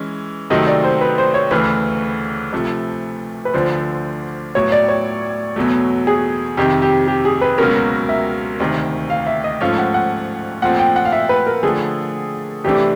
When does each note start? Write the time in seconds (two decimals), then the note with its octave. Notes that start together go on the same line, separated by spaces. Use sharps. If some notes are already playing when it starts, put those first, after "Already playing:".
Already playing: E3 G#3 C#4
0.50 C3 D#3 F#3 A3 C4 D#5
0.67 D5
0.84 C5
1.01 B4
1.18 C5
1.34 C#5
1.51 D2 C#3 E3 A3 B4
2.53 C3 F3 A3
3.45 B4
3.53 D2 D3 F3 C5
4.55 A2 F#3 B3 C#5
4.72 D5
4.89 C#5
5.56 E2 B2 F#3 A3
6.07 G#4
6.57 F2 C3 D#3 G4
6.82 G4
7.07 G4
7.25 G#4
7.41 B4
7.58 C#2 B2 F#3 A#3 C#4 A#4
8.09 E5
8.60 D2 C3 D#3
9.10 F5
9.27 E5
9.44 D#5
9.61 G#2 F3 A3 C#4 F5
9.78 F#5
9.94 F#5
10.62 A#2 F3 A3 C4 F#5
10.79 G5
10.96 F#5
11.05 F5
11.12 E5
11.29 B4
11.46 A#4
11.63 D3 F3 A3 G#4
12.64 C2 C3 E3 A3 D4 G4